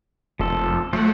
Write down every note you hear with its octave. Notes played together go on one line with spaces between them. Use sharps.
F1 F3 A4
F3 F#3 A3 F#5